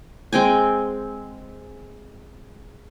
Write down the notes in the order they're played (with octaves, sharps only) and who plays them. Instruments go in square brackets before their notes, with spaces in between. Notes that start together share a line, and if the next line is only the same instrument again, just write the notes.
[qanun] G#3 C4 G5 G#5